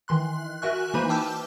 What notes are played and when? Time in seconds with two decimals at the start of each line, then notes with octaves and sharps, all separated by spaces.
0.08 D#3 E3 C6 F#6
0.62 F#4 A#4 E5 G#5 C#6 F#6
0.94 E3 A#3 D#4 B4 C5 B5
1.09 G5 A5 D6 E6 F6 G6